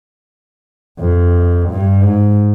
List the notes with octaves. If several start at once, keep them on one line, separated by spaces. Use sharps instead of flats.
F2
G2
G#2